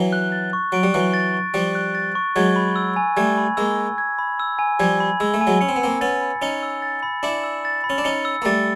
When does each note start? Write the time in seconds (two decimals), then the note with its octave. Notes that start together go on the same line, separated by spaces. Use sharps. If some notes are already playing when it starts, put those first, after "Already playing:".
Already playing: E3 F#3
0.13 F#6
0.32 A6
0.53 C#6
0.72 F#3 D7
0.83 G3
0.94 E3 F#3 F#6
1.14 A6
1.34 C#6
1.54 F3 G3 D7
1.75 F#6
1.95 A6
2.15 C#6
2.36 F#3 G#3 G#6
2.56 B5
2.76 E6
2.96 G#5
3.17 G3 A3 G#6
3.38 B5
3.57 G#3 A#3 E6
3.78 G#5
3.98 G#6
4.18 B5
4.40 E6
4.59 G#5
4.80 F3 G3 G#6
5.00 B5
5.20 G#3 E6
5.34 A3
5.41 G#5
5.47 F#3 G#3
5.61 C#4 C#7
5.69 C4
5.76 B3
5.82 A#3 C4 E6
6.01 B3 C#4 A6
6.21 B5
6.42 C#4 D#4 C#7
6.63 E6
6.82 A6
7.03 B5
7.23 D4 E4 C#7
7.44 E6
7.65 A6
7.84 B5
7.90 C#4
7.98 D4
8.04 C#4 D#4 C#7
8.25 E6
8.42 A#3
8.45 G3 A3 A6